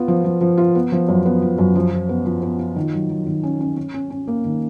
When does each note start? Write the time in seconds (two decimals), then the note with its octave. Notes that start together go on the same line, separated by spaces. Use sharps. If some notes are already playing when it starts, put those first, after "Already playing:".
Already playing: B3 F4
0.08 F3
0.24 F3
0.41 F3
0.57 F4
0.75 B3
0.92 F3
1.08 F#2
1.26 B3
1.42 F3
1.58 F#2
1.75 F3
1.92 F3
2.09 B3
2.26 F3
2.43 B3
2.59 F4
2.76 D#3
2.93 F#3
3.10 F#3
3.26 D#3
3.43 C#4
3.60 C#4
3.77 C#4
3.94 C#4
4.10 C#4
4.27 A#3
4.44 D#3